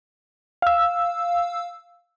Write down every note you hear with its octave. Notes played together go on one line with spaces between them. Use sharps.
F5 E6